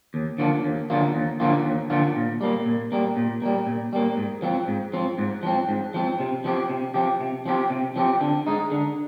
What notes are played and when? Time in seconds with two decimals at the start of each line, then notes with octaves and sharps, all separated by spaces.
0.14 D#2
0.38 D3 F3 A#3 F4
0.64 D#2
0.90 D3 F3 A#3 F4
1.15 D#2
1.40 D3 F3 A#3 F4
1.65 D#2
1.90 D3 F3 A#3 F4
2.16 A#2
2.41 G3 A#3
2.66 A#2
2.92 G3 A#3
3.17 A#2
3.42 G3 A#3
3.67 A#2
3.93 G3 A#3
4.17 G#2
4.42 F3 C4
4.68 G#2
4.93 F3 C4
5.18 G#2
5.43 F3 C4
5.69 G#2
5.94 F3 C4
6.20 C3
6.44 F3 C4 G4
6.70 C3
6.94 F3 C4 G4
7.21 C3
7.46 F3 C4 G4
7.70 C3
7.96 F3 C4 G4
8.21 D3
8.47 G#3 D#4
8.71 D3